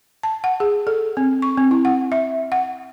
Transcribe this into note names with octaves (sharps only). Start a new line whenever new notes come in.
A5
F#5
G#4
A4
C4
C#6
C4
E4
F#5
E5
F#5